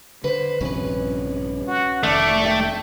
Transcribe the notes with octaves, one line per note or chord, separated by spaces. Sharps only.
D3 B4 C5
A#1 G2 C3 C#4 B4
F#4
F1 D#3 A3 D5
A4 E5 G5